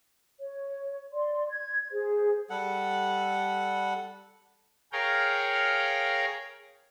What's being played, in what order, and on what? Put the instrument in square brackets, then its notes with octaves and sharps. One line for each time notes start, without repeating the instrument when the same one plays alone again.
[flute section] C#5
D5 C6
G#6
G#4 C5
[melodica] G3 A4 F#5
[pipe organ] G#4 A#4 C#5 F5 G5 A#5